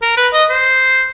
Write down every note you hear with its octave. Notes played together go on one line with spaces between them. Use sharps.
A#4
B4
D#5
C5